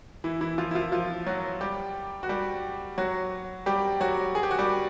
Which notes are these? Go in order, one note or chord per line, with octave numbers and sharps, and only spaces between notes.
E3 E4
E3 E4
F3 F4
E4
F3 F4
F3 F4
F#3 F#4
G3 G4
F#4
G3 G4
F#3 F#4
G3 G4
F#3 F#4
G#4
G4
F#4
G3 G4